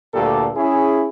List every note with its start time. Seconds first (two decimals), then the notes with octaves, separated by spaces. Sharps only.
0.14 D2 G2 A#2 G4 A4
0.55 C#4 E4 G#4